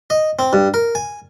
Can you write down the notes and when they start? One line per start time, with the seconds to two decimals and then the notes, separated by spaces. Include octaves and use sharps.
0.10 D#5
0.39 C4
0.53 G2
0.74 A#4
0.95 G#5